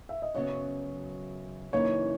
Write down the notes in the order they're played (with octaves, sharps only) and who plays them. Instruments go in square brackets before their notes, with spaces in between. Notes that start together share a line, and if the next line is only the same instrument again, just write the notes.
[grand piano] E5
D#5
[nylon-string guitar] F#2 C#3 F#3 B3 [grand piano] C#5
[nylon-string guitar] F#2 C#3 E3 A#3 D#4 [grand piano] C#5